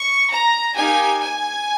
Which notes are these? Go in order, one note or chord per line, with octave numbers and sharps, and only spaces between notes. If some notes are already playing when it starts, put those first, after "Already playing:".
Already playing: C#6
A#5
A#3 D#4 G4 G#5
G#5